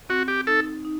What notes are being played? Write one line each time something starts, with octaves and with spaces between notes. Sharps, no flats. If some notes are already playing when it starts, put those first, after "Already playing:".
C4 F#4
G4
D#4 A4
D#4